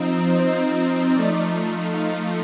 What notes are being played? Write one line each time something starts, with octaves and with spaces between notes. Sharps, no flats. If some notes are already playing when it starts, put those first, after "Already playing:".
Already playing: F3 C4 D#4
C5
F3 A3 D#4 D5
F5